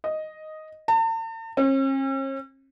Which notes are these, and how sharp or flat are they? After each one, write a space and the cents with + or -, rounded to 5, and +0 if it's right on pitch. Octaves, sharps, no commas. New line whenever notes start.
D#5 +0
A5 +45
C#4 -45